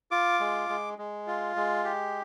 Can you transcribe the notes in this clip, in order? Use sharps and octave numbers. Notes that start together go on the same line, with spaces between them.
F4 D6
G#3
G#3
G#3
F4
G#3
G4